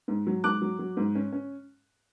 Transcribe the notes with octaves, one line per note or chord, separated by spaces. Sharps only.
G#2
F#3
G#2 D6 F#6
F#3
F#3
G#2
C#4
C#4